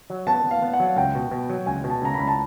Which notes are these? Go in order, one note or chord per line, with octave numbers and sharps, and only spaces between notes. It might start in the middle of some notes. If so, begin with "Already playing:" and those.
F#3
B3 A5
B3
F5
B3
F#5
F#3
C#2 G5
B2
B2
F#3
C#2 G#5
B2
A5
C#2 A#5
B5
C#2
A5